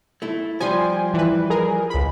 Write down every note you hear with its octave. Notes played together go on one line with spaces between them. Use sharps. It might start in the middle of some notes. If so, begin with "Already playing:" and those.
A3 E4
F3 G3 G#5 C6
E3 B4
G#4 A#4
C#2 B5